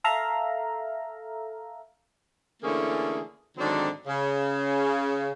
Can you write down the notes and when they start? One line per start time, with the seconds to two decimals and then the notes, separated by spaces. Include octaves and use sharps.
0.04 A4 E5 F5 A#5
2.63 D3 E3 A3 A#3 C#4 G#4
3.58 G#2 D3 D#3 F#3 C4 D4
4.07 C#3